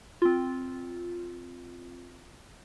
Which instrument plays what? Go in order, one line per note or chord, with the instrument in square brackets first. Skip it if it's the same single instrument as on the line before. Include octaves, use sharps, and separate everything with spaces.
[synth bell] C4 F4